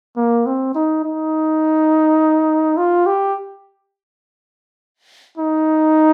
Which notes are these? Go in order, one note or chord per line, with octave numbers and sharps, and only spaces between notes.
A#3
C4
D#4
D#4
F4
G4
D#4